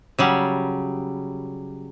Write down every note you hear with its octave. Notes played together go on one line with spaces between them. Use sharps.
C#3 F#3 G3